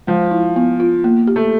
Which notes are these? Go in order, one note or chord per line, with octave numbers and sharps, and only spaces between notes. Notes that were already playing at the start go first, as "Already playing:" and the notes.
F3 G#3
E4
B3
F4
A#3
G4
A3